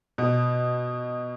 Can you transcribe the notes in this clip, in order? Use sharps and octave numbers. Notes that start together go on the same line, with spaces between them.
B2